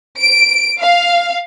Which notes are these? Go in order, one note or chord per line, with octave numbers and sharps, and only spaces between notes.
D7
F5